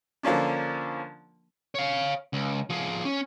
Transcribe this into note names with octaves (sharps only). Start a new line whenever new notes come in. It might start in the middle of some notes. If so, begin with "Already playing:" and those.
D3 F3 A#3 C#4 D4
C#5 F5
C#2
F3 G#4
C#4